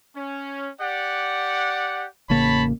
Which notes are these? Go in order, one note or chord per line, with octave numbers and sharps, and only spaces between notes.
C#4
G4 D5 F#5
A1 C#3 A#3 C#5 A5 B5